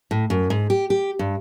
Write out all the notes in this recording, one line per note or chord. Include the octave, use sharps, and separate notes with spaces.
A2
F#2
G#2
G4
G4
G2